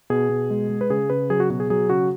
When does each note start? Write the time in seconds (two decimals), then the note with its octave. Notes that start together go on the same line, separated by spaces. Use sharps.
0.10 B2 G#4
0.30 B2
0.50 G#3
0.70 G#3
0.81 B4
0.90 C#3 G#4
1.10 C#3 B4
1.30 F#3 G#4
1.40 F#4
1.50 B2 F#4
1.60 G#4
1.70 F#3 G#4
1.89 C#3 F#4